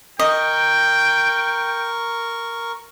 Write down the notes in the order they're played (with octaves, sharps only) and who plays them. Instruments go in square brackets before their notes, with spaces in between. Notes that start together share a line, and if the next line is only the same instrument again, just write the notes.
[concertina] A#4 C#6 [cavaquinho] D#5 [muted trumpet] G5